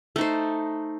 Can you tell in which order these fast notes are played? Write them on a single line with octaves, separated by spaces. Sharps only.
A3 D#4 C5